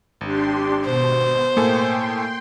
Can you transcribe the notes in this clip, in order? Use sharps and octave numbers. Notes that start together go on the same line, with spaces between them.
G#1 D4 G4 C6
B2 C5
A2 A#3 A4 G5 G#5 C6